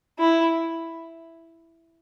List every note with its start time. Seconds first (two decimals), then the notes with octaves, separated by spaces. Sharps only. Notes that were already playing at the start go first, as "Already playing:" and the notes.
0.19 E4